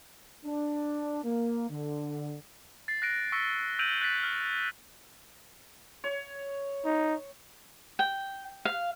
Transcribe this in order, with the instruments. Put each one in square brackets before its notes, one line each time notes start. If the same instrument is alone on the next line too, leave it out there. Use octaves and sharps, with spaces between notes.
[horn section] D4
A#3
D3
[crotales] A6 C7
F#6 A#6 D7
C#6 E6 A#6 B6 C#7
E6 G6 D7 D#7 F7 F#7
F#6 A6 B6
F6
[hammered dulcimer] C#5
[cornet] D#4
[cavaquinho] G5
F5